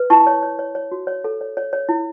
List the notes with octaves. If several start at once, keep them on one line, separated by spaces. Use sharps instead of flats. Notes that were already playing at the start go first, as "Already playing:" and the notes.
Already playing: B4
E4 A5 C#6
C#5
C#5
C#5
C#5
F#4
C#5
A4
C#5
C#5
C#5
E4